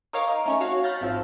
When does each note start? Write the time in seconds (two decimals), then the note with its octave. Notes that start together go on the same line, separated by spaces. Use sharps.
0.13 D#4 A#4 C#5 F5 A#5 D6
0.28 D#4
0.46 A3 C#4 C#5
0.60 F#4 C#5 F5
0.84 B5 F6 G6 A6 A#6
1.01 G#1 F3 E6